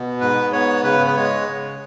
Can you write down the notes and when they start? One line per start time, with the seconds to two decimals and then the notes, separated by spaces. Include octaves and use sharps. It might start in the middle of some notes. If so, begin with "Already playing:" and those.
Already playing: B2 B3
0.20 G#2 B4
0.52 B3 C#5
0.84 C#3 B4
1.06 B4
1.16 G#3 C#5
1.48 C#3